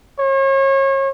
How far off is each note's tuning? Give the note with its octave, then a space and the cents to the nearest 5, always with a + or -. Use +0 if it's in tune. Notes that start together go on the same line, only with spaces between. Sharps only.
C#5 -35